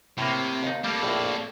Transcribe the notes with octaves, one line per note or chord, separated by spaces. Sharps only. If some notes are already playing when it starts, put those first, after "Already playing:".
A2 C3 A#3
D#2 D#4
G3 A#3 A4
A#1 A2